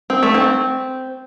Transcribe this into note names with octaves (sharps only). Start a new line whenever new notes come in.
C4
A3
C4